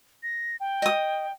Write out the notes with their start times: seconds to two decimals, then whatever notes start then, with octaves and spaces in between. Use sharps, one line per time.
0.23 A#6
0.60 G5
0.82 D#5 D#6